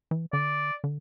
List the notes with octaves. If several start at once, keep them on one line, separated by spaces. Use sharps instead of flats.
E3
D3 D5
D3